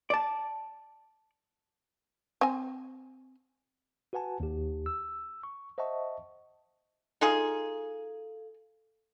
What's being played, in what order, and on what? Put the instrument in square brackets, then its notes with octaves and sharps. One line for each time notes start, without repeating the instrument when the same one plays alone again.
[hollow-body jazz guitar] D5 A5
[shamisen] C4 G#5
[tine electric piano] F#4 B4 F#5 G#5 A5
D#2 G4
E6
C#6
C5 D#5 E5 F#5 A5 C#6
[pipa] D#4 F4 G#4 [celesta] A4 F5